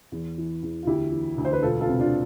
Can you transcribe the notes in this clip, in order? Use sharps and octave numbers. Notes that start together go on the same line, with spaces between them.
E2
E3
E2
F4
D2 E4 G4
E3
D2
C5
B4
E1 F4 A4
F4 A4
C3
D4 F4